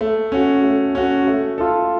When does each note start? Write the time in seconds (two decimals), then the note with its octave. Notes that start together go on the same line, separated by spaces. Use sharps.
0.01 A3
0.32 C#4 F#4
0.64 A3
0.95 C#4 F#4
1.27 A3
1.58 F4 A4